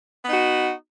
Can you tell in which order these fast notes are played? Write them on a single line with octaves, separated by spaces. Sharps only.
B3 D#4 F#4